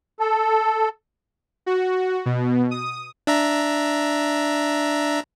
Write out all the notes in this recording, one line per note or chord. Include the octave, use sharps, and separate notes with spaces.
A4
F#4
B2
D#6
D4 E5 A#5